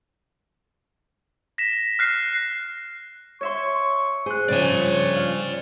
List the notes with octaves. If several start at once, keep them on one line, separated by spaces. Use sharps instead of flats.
A#6 B6 E7
F6 F#6 C7
C#5 E5 C6 C#6
G#4 C5 F#6
G2 C#3 F3 C#5 D5 G#5
F5